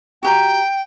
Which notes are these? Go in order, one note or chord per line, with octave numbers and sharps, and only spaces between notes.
F#4 G4 G5 A#5